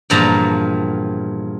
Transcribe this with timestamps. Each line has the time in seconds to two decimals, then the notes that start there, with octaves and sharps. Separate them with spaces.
0.10 E2 G2 A#2 F3 A5 A#5